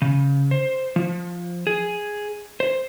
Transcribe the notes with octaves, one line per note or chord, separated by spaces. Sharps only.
C#3
C5
F3
G#4
C5